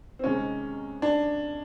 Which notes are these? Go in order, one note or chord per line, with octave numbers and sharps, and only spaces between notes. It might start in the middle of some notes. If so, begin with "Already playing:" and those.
C4
C3 D#3 G#3 C#4
D4